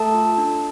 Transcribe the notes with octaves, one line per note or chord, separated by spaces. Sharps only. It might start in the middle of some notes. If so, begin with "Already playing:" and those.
Already playing: A3 A4 A5
F4
D4